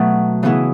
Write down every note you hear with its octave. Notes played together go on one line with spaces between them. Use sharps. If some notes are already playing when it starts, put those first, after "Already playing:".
Already playing: B2 F#3 A3 D#4
C#3 E3 B3 E4 G#4